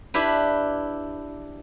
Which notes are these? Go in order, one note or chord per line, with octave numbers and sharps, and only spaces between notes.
D4 E4 G4 B4